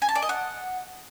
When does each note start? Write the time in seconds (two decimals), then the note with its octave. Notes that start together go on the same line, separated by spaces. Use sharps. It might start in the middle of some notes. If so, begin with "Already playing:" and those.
0.02 G#5
0.09 A5
0.15 D5
0.22 D#5
0.29 F#5